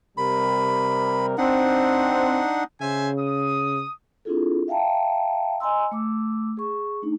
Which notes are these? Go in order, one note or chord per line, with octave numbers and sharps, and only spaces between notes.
C3 G3 A#4 B5
C4 D4 D#4 F#5
C#3 C5 E5 G#5
D#6
C4 D4 E4 F4 G#4 A4
E5 F5 G5 A5 A#5
D#5 G#5 A#5 C6 E6
A3 D6 E6
G#4 C#6
A3 D4 D#4